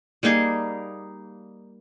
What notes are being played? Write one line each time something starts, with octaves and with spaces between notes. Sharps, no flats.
G3 A#3 D#4 G#4